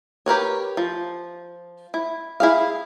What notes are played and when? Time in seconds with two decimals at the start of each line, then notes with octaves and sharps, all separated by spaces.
0.26 G4 A#4 B4 C#5
0.77 F3
1.94 E4
2.40 E4 G#4 F5